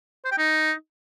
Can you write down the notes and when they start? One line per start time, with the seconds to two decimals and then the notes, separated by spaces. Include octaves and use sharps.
0.25 C5
0.31 G5
0.38 D#4